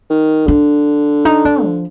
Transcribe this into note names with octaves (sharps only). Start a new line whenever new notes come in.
D#3
D3 D4
D#4
D4
F3